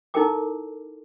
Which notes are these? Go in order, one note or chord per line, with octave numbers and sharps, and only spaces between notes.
D#4 E4 A4 A#4 G5 D6